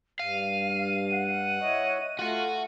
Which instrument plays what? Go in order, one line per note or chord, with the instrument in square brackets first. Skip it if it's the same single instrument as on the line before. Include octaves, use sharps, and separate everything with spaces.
[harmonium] G2 [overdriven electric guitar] F5 [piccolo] D#7
[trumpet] F#5
[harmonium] E4 C#5 D#5
[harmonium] A3 [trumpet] F4 [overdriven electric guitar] F#4 F#5